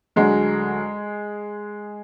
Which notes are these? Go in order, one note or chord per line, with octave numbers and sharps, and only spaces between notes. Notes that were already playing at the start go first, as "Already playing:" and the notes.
D2 D3 F#3 G#3 G#4